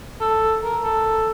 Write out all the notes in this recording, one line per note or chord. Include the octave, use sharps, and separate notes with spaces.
A4
A#4
A4